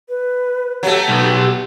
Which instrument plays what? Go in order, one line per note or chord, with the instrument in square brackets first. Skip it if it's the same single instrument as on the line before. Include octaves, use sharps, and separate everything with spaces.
[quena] B4
[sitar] F#3 A3 [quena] G4
[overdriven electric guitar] B1 B3